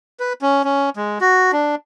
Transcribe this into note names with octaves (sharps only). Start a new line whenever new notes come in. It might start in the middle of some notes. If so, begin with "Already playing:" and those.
B4
C#4
C#4
G#3
F#4
D4